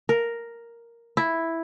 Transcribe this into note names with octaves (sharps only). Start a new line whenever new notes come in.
A#4
E4